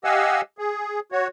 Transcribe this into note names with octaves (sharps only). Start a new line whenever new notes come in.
G4 D#5 F5 F#5 G#5 E6
G#4
F#4 C#5